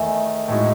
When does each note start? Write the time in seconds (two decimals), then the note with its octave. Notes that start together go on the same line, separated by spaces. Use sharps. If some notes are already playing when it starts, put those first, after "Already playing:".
Already playing: E2 D#3 A3 D#4 E5 G#5
0.48 A2 G#3 D#4 F#4